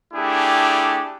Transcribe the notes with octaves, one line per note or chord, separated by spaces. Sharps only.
A3 D4 E4 G4 G#4